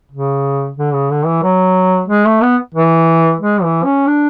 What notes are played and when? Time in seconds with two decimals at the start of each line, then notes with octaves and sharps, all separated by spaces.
0.12 C#3
0.77 D3
0.94 C#3
1.11 D3
1.26 E3
1.43 F#3
2.08 G#3
2.25 A3
2.41 B3
2.75 E3
3.40 G#3
3.63 E3
3.84 C#4
4.07 D4